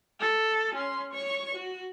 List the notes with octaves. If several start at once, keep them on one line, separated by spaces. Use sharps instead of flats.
A4
C#4 C6
C#5 C#6
F#4